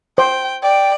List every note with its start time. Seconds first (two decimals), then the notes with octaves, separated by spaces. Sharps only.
0.18 C5 G5
0.63 D5 G5